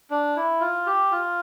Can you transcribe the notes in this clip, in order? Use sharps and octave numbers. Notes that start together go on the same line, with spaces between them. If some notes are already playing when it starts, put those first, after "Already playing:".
D4
E4
F4
G4
F4